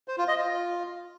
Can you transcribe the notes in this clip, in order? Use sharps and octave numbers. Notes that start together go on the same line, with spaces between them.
C5
F4
D#5
F4